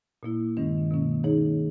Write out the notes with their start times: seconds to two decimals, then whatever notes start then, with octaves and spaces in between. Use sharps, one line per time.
0.23 A#2 A#3 E4
0.57 G2 D#3 G#3 C#4
0.91 B2 A#3 C#4
1.24 D#3 A#3 D#4 G#4 C#5